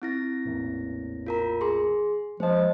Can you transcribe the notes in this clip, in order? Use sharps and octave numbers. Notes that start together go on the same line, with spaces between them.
C4 E4 A#6
A1 E2 A#2
F4 A#4 A#5
G#4 C6
F3 G#3 C5 D#5